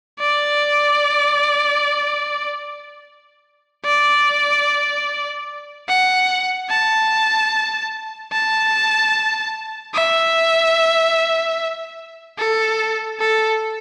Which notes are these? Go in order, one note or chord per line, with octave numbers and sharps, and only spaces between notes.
D5
D5
F#5
A5
A5
E5
A4
A4